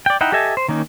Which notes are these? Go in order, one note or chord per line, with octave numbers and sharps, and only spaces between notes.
D5 G5
D#4 E4 F#5 G5
G4 A4 D#5 E5 G#5
C5
D#3 A#3 C#4 D#4